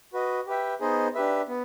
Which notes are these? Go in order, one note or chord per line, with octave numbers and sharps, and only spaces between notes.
F#4 B4 D#5
G4 B4 E5 G5
B3 D#4 G#4 C5 D#5
D4 G4 B4 E5
B3